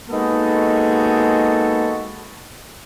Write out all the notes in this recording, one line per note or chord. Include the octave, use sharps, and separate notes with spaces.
G#3 A#3 B3 D#4 F#4 A4